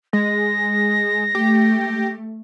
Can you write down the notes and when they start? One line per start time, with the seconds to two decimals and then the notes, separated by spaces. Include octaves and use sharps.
0.13 G#3 A#6
1.35 A3 G4